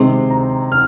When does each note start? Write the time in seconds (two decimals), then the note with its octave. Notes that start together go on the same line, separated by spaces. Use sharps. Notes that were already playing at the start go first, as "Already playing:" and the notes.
Already playing: C3 D#3 G#3 C4 C6
0.30 A#5
0.72 F6